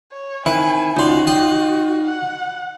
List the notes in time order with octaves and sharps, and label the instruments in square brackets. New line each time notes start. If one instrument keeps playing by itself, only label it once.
[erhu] C#5
[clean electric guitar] D#3 C4 E4 [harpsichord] B4 [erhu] G#5
[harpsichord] C#2 D5 [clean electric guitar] D#4 C6 [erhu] F#4
[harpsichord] D5 D#5 G5
[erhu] F#5